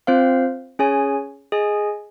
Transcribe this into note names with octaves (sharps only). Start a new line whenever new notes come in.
C4 F4 C5 F5
C#4 G#4 C#5 G#5
G#4 D#5 G#5